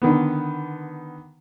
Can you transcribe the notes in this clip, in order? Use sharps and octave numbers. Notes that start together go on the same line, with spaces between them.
D3 D#3 B3